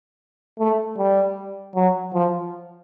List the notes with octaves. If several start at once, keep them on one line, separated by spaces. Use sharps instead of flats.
A3
G3
F#3
F3